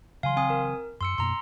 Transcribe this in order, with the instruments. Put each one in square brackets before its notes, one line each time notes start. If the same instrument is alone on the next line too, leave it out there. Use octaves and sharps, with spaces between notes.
[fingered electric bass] C#3 E3 F#3 [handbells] F5 G#5 C6
[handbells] C4 G#5 D#6
A#4
[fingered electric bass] F#2 [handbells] C6 E6 C#7
[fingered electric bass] F#2 B2 A#3 [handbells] A#5 C6